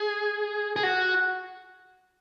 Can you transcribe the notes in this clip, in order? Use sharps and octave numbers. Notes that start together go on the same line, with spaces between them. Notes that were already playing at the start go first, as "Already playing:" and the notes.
Already playing: G#4
G#4
F#4